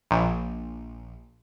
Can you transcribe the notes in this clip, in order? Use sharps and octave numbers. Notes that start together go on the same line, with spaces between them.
A#1